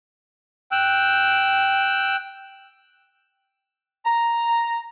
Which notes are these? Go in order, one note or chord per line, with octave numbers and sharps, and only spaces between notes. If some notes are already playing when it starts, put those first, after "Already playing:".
G5 E6 F#6
A#5